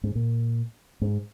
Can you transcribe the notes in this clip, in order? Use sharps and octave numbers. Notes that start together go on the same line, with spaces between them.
G#2
A#2
G#2